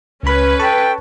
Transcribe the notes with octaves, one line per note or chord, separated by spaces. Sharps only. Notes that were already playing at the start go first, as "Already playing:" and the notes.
C#2 C#4 B4 B5
A4 G5 A5 C#6 B6